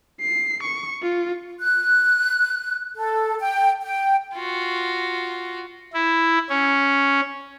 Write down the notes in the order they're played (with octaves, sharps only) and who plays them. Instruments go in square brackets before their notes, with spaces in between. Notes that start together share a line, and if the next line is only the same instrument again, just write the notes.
[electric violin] C7
C#6
F4
[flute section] F#6
A4
G5
G5
[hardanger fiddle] F4 F#4
[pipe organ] E4
C#4